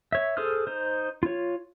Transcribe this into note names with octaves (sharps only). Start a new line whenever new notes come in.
C#5 E5
G#4 A4 C5 D#6 F6
D#4 C5
F4 C#5